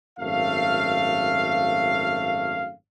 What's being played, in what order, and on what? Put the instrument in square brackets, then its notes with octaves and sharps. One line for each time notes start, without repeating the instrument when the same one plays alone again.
[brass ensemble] G#1 F#2 A3 F5